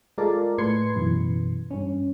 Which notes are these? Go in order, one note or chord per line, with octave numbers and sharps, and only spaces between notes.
G#3 F4 A4 A#4 D5
A2 B4 C6 G#6 C7 C#7
F#2 B2 E3
G2 C#4